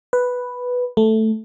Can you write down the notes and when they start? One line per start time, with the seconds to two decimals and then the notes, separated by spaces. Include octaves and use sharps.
0.13 B4
0.97 A3